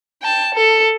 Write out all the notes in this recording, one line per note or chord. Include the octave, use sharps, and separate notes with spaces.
G5 A5
A4